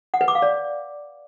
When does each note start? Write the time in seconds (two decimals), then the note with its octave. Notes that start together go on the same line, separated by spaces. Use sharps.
0.14 F#5
0.21 B4
0.28 D6
0.35 F5
0.42 D5